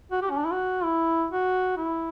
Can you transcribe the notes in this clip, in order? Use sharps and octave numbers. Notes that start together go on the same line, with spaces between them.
F#4
G4
C#4
D4
E4
F#4
E4
F#4
E4